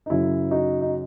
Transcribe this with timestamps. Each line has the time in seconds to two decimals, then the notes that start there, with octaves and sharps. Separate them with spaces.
0.06 D#4
0.10 F#2 C#3 F#3 E4
0.51 D#4 F#4
0.81 D#4